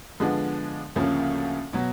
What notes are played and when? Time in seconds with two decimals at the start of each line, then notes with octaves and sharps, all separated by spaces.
0.20 D3 F3 G#3 B3 D4
0.96 D2 C#3 F3 A#3 C#4
1.73 B2 F#3